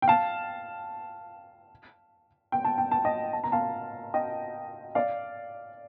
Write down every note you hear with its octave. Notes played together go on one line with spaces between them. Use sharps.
G5
F5 A5
G5
A5
G5
A5
D#5 G5
A5
A#5
F5 A5
D#5 G5
D5 F5